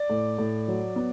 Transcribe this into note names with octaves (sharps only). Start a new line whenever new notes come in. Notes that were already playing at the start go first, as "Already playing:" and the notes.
Already playing: D5
A2
A2
F#3
B3